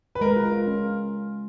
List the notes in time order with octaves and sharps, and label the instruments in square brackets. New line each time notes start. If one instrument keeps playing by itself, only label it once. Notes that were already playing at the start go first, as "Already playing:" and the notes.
[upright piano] B4
[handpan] G#3 [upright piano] A#4
[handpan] F4
F4
C#4